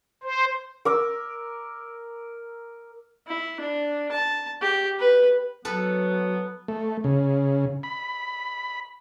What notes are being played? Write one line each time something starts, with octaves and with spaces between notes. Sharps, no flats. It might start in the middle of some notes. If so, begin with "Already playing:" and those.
C5
A#4 D6 E6
E4
D4
A5
G4
B4
F#3 B3 A4 B4
A3
C#3
B5